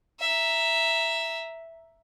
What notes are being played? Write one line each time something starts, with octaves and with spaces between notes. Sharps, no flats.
E5 A#5